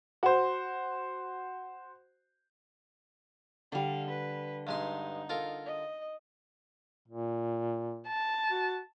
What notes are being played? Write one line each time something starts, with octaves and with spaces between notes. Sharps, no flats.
F#4 C5
D3 G3 F5
B4
G2 G#3 D#4 C6
F4 A4 A#4
D#5
A#2
A5
F#4